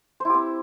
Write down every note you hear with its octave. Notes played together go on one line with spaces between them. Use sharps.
C4 E4 G4 C5